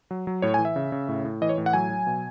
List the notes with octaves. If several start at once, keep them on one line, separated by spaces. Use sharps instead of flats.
F#3
F#3
A2 C#5
G#5
E3
E5
C#3
C#3
A2
A2
E3 D#5
C#5
A2
F#5
F#3 G#5
F#3
B2